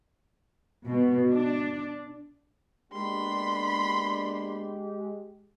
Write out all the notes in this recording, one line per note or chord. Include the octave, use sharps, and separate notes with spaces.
B2
D4
G#3 A#3 B3 D4 G4 B5 C6